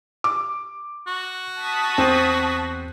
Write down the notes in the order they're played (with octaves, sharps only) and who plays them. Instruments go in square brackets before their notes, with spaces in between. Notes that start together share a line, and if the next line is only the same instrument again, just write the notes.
[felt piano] D6
[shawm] F#4
[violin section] A5 D#6 B6
[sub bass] E2 [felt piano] C4